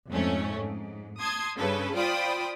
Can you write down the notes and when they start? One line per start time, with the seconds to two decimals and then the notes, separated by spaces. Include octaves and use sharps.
0.10 F2 G#2 A3 C#4
0.58 G#2
1.19 A5 C6 D#6 G#6
1.57 G2 C#3 A4 B4
1.96 F4 C5 D5 G5 B5 D#6